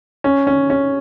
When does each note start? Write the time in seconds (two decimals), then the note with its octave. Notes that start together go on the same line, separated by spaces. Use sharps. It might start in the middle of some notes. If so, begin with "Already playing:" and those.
0.24 C#4
0.47 C#4
0.70 C#4